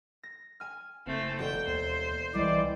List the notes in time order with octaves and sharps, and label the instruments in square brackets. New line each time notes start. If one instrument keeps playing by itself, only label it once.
[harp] A#6
G#5 F6
[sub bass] F#1 [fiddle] A3 C4
[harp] E1 F#4 A4 [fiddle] G5
[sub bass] D#2 [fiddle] C5
[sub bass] C2 [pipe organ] E3 D5 [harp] G3 G#3